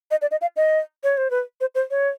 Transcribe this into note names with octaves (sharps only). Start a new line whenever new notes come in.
D#5
D5
D#5
F5
D#5
C#5
C5
B4
C5
C5
C#5